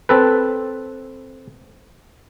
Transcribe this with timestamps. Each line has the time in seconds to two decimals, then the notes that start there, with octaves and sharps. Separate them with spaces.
0.09 C4 A4 B4